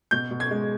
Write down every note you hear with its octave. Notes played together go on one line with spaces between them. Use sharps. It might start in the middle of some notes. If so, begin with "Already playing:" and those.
B2 G6
B2
G#6
G#3